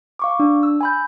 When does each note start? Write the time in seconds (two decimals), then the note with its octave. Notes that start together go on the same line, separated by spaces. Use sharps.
0.19 F5 C#6 D6
0.40 D4
0.63 E6
0.81 G#5 B5 G6